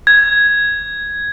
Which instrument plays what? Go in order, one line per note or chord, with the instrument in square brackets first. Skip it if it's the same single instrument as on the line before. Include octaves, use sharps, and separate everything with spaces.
[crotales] G#6